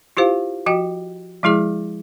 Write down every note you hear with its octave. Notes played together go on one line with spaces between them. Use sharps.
E4 F4 G4 C5 F5
F3 F#4 D#5 G5
F3 G#3 E4 G#4 D6